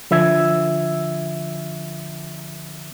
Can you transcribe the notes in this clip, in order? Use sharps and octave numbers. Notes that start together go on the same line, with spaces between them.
D3 F3 E5 E6 G#6